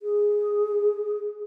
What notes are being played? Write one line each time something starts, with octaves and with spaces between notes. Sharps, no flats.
G#4